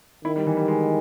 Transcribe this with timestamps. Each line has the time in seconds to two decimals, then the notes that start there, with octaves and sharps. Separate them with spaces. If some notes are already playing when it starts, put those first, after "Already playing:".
0.24 D#3 E4
0.36 G3
0.47 E3
0.57 G3
0.68 G#3